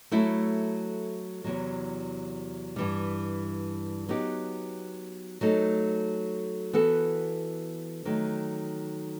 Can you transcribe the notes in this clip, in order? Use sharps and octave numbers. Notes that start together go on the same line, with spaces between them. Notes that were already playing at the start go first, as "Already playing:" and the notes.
F#3 A3 E4 A4
E2 C3 F#3
G2 E3 G3
F#3 B3 D#4 G4
F#3 A3 D#4 A4
E3 B3 F#4 A4
D#3 F#3 A3